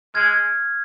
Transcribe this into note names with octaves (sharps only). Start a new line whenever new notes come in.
G#3 F6 G#6